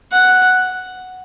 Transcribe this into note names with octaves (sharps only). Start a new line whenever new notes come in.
F#5